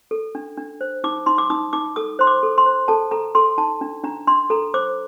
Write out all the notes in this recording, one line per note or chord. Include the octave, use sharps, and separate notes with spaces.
A4
D4
D4
C5
D#4 D6
D#4 C6
D6
D#4 D#6
D#4 D6
A4 D#6
C5 C6
D6
A4
C6
C5
A4 A5
A4 A#5
A4 C6
D#4 A5
D4
D4 A#5
D4 C6
A4 A#5
C5 D6